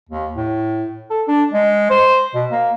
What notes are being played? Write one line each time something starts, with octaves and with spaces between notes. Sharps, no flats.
D#2
A2
A4
D4
G#3
C5
B2
A#3